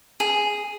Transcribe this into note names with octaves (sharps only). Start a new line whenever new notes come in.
G#4